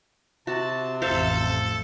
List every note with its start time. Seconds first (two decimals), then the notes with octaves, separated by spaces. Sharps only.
0.47 C3 F#4 A5
1.02 A1 F2 A4 C5 E5 F5